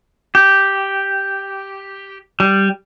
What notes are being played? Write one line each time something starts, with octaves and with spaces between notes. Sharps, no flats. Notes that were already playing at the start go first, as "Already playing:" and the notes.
G4
G3